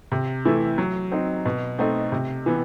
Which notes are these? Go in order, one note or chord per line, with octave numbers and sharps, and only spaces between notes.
C3
E3 A3 E4
F#3
C4 D#4
B2
A3 C4 D#4
C3
E3 B3